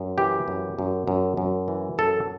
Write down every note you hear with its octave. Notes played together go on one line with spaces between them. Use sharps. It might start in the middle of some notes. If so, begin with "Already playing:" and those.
Already playing: F#2
E3 G4
F#2
F#2
F#2
F#2
E3
F#2 A4